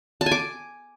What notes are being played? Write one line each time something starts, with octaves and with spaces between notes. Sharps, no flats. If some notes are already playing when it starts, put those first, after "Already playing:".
A5
G#5
D6